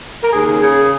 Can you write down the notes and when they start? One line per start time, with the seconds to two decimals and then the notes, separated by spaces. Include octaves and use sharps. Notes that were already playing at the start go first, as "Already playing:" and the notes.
0.23 A#4
0.32 D#2 G#4
0.48 C#3
0.62 C#3 G#4